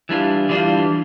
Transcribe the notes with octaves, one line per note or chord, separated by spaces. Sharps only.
E3 G3 D4 F4
E3 G3 D4 F4